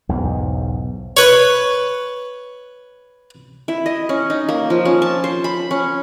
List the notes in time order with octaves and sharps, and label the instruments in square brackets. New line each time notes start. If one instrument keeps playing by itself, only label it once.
[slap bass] B1 E2 G#2
[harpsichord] B4 C#5
[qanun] E4
D#5
C#4
D#4
A#3
F3
C#4
A5
C5
B5
C#4